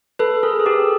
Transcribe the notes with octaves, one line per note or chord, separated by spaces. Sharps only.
A4 B4
G#4 A#4
G#4
G4 A4